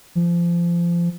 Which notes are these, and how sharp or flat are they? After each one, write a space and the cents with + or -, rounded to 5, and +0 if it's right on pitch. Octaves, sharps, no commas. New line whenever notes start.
F3 -25